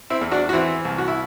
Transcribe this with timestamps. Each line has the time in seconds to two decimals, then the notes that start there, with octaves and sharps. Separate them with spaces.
0.10 C4 E4
0.21 E2
0.32 D4 F#4
0.49 F#4
0.53 E3 C4 E4
0.85 C2
0.98 F#4
1.08 E4